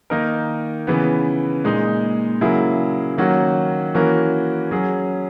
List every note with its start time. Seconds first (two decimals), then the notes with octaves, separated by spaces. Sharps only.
0.10 D#3 A#3 D#4 A#4
0.87 C#3 E3 B3
1.64 A#2 G#3 D#4
2.41 C#3 F#3 A#3 E4 G#4
3.18 D#3 F#3 A#3 C#4 F#4
3.94 E3 A#3 C#4 F#4 A#4
4.71 F#3 C#4 G#4